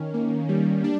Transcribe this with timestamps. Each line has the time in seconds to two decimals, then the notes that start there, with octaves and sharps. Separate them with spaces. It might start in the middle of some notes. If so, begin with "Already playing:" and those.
Already playing: D#3 C#4
0.14 A#3
0.49 G3
0.84 D4